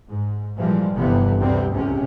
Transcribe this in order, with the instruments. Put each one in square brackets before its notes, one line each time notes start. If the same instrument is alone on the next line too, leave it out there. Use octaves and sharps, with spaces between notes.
[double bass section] G#2
A#2 E3 F3 G3 G#3
G1 C3 E3 F3 B3
G1 D2 C3 G3 B3 C4
C#2 A2 C3 C#4